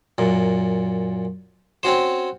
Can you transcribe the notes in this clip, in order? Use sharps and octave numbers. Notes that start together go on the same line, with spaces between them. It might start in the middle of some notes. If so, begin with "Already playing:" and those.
F#2 A#2
C4 C#4 F#4 C5